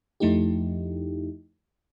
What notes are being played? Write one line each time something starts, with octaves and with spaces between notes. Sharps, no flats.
F2 F3 A3 D#4 E4 G4